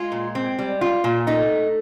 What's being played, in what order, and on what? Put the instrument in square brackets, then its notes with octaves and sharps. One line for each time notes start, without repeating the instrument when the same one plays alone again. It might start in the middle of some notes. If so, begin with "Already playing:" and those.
Already playing: [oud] G#3 [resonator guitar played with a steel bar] F4
[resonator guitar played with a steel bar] A#2
C4
G3
F4
A#2
[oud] A3 [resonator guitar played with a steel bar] D#4